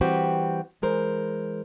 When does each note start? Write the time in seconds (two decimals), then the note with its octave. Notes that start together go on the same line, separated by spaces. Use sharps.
0.01 E3 G3 C4 F#4 G4
0.82 E3 G#3 A#4 C5